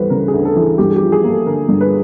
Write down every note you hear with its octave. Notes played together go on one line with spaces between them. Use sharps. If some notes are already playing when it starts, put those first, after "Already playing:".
Already playing: D2 E3 G3 B4 C5
C#3 A#4
G#4
D2
A4
E3
G#4
G2 G4
G#4
G4
F3
G#4
A#3
A4
D3 A#4
G2
B4